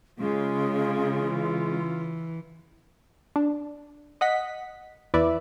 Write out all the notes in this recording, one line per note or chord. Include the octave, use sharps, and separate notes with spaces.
C#3 G#3 F4
E3
D4
D#5 F#5 B6
E2 E4 B4 D5 E5